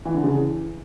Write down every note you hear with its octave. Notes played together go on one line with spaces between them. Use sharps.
E3
D3
C#3
E3